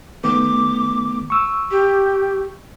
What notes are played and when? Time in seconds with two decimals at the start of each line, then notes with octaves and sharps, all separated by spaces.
0.24 D#3 A3 B3 D6
1.30 C#6 E6
1.71 G4